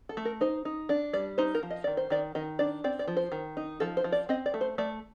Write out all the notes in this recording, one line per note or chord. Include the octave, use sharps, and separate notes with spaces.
A4
A3
A#4
D#4 C5
D#4
D4 D5
G3 D5
D#4 C5
A#4
F3
D#5
D#3 D5
C5
D#3 D5
D#3 D#5
D4 D5
C4 D5
D5
F3
C5
D#3
D#4
F3 A4
C5
F3
D5
C4 D#5
D5
A3
C5
A3 D5